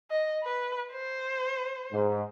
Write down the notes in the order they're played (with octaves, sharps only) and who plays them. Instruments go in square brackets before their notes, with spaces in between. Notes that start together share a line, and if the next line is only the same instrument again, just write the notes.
[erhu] D#5
B4
C5
[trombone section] G#2